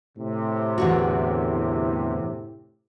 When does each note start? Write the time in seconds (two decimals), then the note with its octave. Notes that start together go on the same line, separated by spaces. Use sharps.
0.17 A2 C3
0.78 E2 D3 F#4